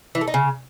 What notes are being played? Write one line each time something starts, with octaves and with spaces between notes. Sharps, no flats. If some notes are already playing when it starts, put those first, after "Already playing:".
E3
A3
D#4
C#3